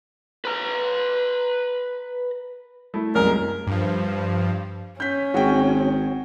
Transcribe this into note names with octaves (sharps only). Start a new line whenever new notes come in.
B4 A#5
A3 E4
C2 F#2 G#3 A#4
G2 F3
C#4 G6 B6
G#1 F#4 G#4 G5